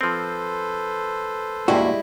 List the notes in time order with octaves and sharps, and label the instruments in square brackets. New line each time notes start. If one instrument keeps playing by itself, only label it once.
[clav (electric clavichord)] F3 C4 [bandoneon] A4 B4 C5
[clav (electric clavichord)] E2 G2 [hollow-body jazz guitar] A#2 F#4 [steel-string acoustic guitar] G3 G#3 E4